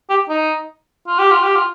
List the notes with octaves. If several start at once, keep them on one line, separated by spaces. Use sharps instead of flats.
G4
D#4
F4
G4
F4
G4
F4